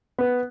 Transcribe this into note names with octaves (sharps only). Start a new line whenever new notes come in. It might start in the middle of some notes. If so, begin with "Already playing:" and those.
B3